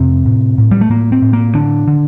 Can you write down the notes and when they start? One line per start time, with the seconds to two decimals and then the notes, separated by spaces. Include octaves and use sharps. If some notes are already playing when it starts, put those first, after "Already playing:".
Already playing: F2 C3 C4
0.26 A2
0.58 A2
0.71 G3
0.81 A3
0.90 A2 A#3
1.12 C4
1.22 A2
1.33 A#3
1.55 D3 D4
1.87 D3